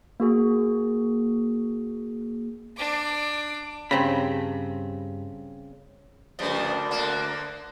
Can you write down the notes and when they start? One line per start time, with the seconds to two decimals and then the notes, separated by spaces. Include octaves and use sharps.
0.20 A#3 F#4 G#4
2.77 D4 D6
3.91 G2 C#3 C4 A#5 B5
6.39 D2 G2 C#3 F3 D4 A#4
6.91 D3 A#3